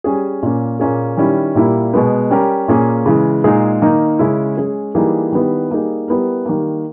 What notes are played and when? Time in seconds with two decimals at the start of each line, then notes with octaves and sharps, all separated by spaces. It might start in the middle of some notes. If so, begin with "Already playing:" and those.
0.04 G3 C#4 G#4
0.43 A#2 A#3 C#4
0.80 A#2 A#3 C#4 G#4
1.17 D#3 G3 C#4 E4
1.55 A#2 G3 A#3 E4
1.93 B2 G#3 B3
2.30 G3 C#4 G4 A#4
2.68 A#2 A#3 C#4 G#4
3.06 C#3 E3 G#3
3.44 A#2 G#3 D#4 G#4
3.82 D#3 A#3 D#4
4.19 C#3 G#3 C#4 E4
4.57 G#3 C#4 G#4
4.95 E3 G3 A#3 D#4 G#4
5.32 D#3 G3 B3 E4
5.70 G3 A#3 D#4 G#4
6.08 G3 B3 E4 A#4
6.46 D#3 G3 A#3